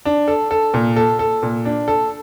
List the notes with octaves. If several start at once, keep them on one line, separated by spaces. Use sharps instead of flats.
D4
A4
A4
A#2
A4
A4
A#2
D4
A4